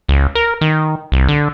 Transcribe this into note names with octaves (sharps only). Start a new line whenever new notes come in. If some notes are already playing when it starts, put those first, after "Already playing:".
C#2
A#4
D#3
C2
D3